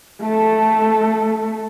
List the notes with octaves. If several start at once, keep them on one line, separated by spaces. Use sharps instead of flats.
A3 A4